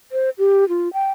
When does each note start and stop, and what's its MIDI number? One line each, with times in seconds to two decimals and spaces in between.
0.12 0.30 72
0.38 0.68 67
0.69 0.91 65
0.93 1.11 79